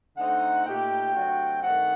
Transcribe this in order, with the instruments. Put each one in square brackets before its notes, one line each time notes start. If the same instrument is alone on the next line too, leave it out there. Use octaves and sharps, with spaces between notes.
[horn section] D3 A3 C4 D#4 [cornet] F#5
[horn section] A#2 A3 D#4 G4 [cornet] G5
[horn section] C3 F#3 A3 D4 F#4
[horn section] G2 D#3 A3 C4 D#4 [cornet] F#5